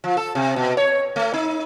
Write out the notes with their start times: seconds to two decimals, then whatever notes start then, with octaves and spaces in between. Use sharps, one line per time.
0.04 F3
0.17 A4
0.35 C3
0.56 B2
0.77 C#5
1.16 A3
1.34 D#4